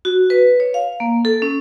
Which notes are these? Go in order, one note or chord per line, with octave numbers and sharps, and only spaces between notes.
F#4
B4
C#5
F5
A#3
A4
C#4